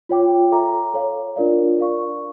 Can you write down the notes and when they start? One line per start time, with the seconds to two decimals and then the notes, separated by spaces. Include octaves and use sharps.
0.09 F4 C#5 G5 D6
0.52 A4 E5 A#5 D6
0.94 A4 C#5 F5
1.36 D4 F4 A#4 D5 F5
1.78 A#4 D5 F5 C#6